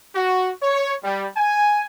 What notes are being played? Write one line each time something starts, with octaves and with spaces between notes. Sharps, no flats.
F#4
C#5
G3
G#5